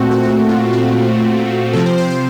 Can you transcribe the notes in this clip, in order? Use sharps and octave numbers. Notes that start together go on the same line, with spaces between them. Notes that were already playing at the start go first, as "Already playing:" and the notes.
Already playing: A#2 A3 C4 F#4
F#4
F#4
F4
F#4
C3 F3 C4 A4
C5
C5
C5